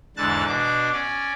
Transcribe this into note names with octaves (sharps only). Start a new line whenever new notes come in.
E2 G#2 D3 A5 F#6 A6
B2 D4 D6
C#4 D5